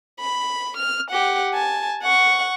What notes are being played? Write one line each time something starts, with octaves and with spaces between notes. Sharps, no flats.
B5
F6
G4 F#5
G#5 A5
F#5 C#6